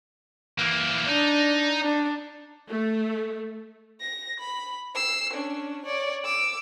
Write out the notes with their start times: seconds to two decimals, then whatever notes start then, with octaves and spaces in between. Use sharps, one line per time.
0.59 E3 A#3
1.08 D4 D#4
1.83 D4
2.68 A3
4.01 A#6
4.40 B5
4.95 E6 C7
5.33 C#4 D4
5.86 C#5 D5
6.25 D6 E6